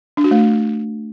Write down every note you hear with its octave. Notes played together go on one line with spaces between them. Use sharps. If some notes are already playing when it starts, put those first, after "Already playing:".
D4
F#4
A3